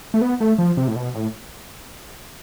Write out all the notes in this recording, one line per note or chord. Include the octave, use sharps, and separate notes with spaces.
A3
B3
A3
F3
C3
A2
B2
A2